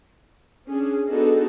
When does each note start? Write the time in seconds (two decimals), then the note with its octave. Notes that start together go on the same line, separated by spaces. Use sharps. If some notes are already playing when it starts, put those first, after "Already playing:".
0.68 C#4 D4 G#4
1.09 B3 D4 D#4 F#4 G#4 A4